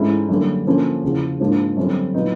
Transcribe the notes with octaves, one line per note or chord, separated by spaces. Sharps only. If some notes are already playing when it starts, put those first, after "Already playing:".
Already playing: G#2 E3 A3 C#4 E4
F#2 D3 G3 A#3
D3 F3 A#3 C#4
E2 C#3 F3
G#2 F3 A#3 D4
F#2 D3 G3 C4
A#2 F#3 B3 D#4